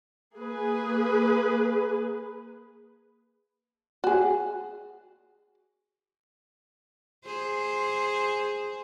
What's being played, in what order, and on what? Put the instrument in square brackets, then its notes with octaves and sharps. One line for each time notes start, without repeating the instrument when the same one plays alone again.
[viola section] A#3 G#4 B4
[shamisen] F#4 G#4
[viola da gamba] G#4 C5